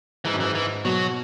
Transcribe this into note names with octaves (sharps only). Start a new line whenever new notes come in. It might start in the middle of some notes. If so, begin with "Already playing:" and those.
G#2 E3
F#2
G#2 E3
E3
B2 F#3